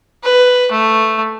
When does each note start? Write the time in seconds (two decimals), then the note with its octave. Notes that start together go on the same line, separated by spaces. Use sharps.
0.24 B4
0.72 A3